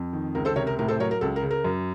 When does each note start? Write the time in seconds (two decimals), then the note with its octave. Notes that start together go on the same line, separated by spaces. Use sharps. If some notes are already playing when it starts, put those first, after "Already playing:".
Already playing: F2
0.13 D#3
0.35 C#2 A#4
0.45 A4 C5
0.56 C3 A#4 C#5
0.67 A#4
0.79 A2 A#4
0.88 A4 C5
0.99 F#3 A#4 C#5
1.11 A#4
1.21 C#2 A4
1.36 A#4
1.43 C#3
1.51 A#4
1.64 F#2